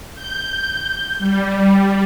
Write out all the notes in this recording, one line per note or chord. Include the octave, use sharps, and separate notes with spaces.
G6
G3